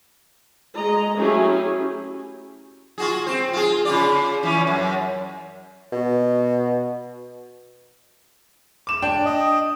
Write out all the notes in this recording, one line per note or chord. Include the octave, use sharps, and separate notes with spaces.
G#3 D#5 A#5
F#3 A3 C#4 E4 G4 G#4
F4 F#4 G#4
C4 C5
F4 G#4
C#3 F4 D5
E3 C#4
F#2
B2
D6 E7
D4 G5
D#5